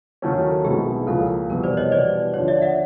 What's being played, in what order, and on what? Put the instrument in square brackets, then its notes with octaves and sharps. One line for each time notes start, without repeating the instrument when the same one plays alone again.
[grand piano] D#2 D#3 F#3 A3 C#4 [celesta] A4
[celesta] A4
[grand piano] B1 B2 G#3 C4 E4 [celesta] G#4
[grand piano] C#2 C#3 F3 A#3 [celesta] A4
[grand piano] F1 E2 B2 G3 [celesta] A#4
[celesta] C5 D5
C#5 D#5
[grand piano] E2 B2 G3 [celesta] C5 D5
[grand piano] D#2 D3 F3 [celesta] C#5
[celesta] D5 E5
E5 F#5